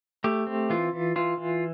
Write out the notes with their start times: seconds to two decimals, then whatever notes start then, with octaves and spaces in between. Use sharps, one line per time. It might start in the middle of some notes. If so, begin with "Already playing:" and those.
0.24 A3 G4
0.47 C4
0.70 E3 F4
0.93 E3
1.16 E3 F4
1.38 E3